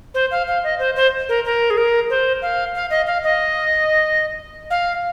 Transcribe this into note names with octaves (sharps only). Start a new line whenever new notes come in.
C5
F5
F5
D#5
C5
C5
A#4
A#4
G#4
A#4
C5
F5
F5
D#5
F5
D#5
F5